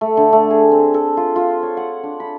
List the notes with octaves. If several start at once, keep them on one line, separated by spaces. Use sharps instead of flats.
A3
D3
A3
G#4
C4
A4
F4
F4
C#5
F#5
D4
B5